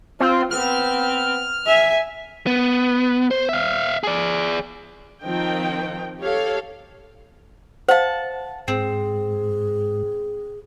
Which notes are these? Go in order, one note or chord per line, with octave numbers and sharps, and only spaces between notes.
C4 F4
B3 C4 F6
E5 G#5
B3
C5
E5 F5
G#4 D5
D#3 F3 C4 D#4 G5
G4 A4 C#5 F5
C5 F5 F#5 A5
G#2 C4 G#4